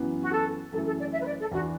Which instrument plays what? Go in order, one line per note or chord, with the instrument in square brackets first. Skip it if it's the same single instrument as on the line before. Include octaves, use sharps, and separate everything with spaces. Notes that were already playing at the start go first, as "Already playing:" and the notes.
Already playing: [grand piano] F#2 E3 B3
[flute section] F#4
A4
[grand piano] F#2 E3 A3 [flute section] A4
[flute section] A4
D5
E5
B4
D5
A4
[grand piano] E2 E3 D4 [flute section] F#4